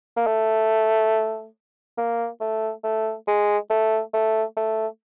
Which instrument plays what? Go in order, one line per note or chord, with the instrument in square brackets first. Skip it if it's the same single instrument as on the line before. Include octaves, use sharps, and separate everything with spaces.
[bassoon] A#3
A3
A#3
A3
A3
G#3
A3
A3
A3